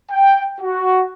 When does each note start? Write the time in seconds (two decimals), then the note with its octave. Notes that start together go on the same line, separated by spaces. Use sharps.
0.11 G5
0.61 F#4